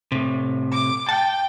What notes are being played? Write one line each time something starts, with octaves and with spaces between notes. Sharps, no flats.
A2 C3
D6
G5 A5